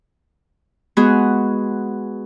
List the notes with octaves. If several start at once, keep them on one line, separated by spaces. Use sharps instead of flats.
G#3 B3 F#4 G#4